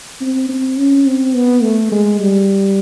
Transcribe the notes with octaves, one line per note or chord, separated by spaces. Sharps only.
C4
C4
C#4
C4
B3
A3
G#3
G3